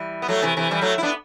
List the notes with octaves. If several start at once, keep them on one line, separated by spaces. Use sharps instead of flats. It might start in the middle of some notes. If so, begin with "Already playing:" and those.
Already playing: E3 G3
B3
F#3 A3
C3 E3
C3 E3
E3 G3
F#3 A3
E4
B3 D4